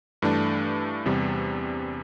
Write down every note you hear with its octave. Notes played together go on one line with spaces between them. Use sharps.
G2 E3 A3 D4
E2 C3 G3